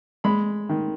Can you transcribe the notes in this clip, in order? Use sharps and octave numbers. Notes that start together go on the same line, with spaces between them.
G#3 B5
D#3